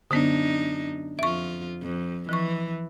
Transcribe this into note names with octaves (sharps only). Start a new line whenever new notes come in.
F#2 D3 B3 D4 D#4
F2 F4 E5 C#6
F2
E3 F3 C#6